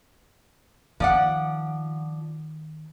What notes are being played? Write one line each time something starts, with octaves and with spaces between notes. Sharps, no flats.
D#3 F3 D5 F#5